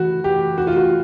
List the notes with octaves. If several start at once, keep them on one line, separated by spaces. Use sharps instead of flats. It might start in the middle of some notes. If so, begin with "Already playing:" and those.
Already playing: E3 F#4
G4
F#4
F4
F#4